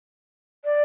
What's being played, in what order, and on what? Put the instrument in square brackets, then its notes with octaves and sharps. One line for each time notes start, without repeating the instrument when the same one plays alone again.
[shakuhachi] D5